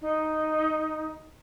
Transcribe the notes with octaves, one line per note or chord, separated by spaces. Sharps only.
D#4